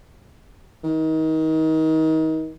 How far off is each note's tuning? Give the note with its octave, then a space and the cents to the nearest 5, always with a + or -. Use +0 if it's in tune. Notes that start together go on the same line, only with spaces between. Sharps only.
D#3 +30